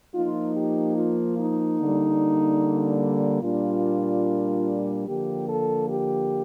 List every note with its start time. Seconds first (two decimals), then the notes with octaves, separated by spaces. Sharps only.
0.15 F3 A#3 D#4 F4
0.56 G4
0.97 F4
1.38 D#4
1.80 D3 G3 A#3
3.43 A#2 G3 A#3 D4 F4
5.08 D3 F3 A#3 G4
5.50 A4
5.90 G4